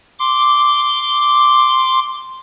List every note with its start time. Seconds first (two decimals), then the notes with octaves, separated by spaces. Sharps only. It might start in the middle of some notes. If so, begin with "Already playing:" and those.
0.19 C6 D6